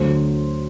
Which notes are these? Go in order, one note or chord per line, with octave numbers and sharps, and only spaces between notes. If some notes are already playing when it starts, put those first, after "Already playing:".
Already playing: D2 D3 F#3 A3 C5